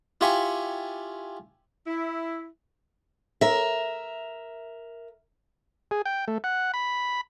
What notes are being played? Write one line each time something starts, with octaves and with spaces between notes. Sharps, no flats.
E4 F4 G4 G#5 B5 C#6
E4
A#4 E5
G#4
G5
A3
F#5
B5